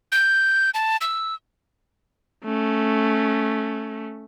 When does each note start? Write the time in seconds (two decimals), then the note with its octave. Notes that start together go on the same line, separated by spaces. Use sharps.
0.12 G6
0.74 A5
1.01 E6
2.44 A3 C#4